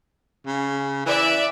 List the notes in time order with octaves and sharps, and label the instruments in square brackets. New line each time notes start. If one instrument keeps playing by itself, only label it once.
[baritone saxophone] C#3
[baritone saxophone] E3 [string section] D5 E5